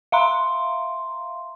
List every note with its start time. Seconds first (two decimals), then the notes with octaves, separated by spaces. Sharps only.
0.12 E5 F5 A#5 C6